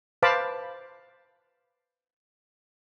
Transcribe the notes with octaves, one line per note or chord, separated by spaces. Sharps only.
B4 C5 F5 A5 B5 D6